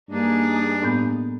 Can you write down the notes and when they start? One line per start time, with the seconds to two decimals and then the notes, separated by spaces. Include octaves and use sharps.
0.10 G2 A#3 D4 D#4 G#4
0.82 A2 B3 G6